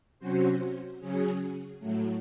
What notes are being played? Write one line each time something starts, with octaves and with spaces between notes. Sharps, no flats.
C3 F#3 C#4 F#4 C5
C#3 F#3 C#4 G#4
A2 F#3 A3